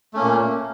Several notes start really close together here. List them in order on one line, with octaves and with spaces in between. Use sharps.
A3 C#4 A#3 A#2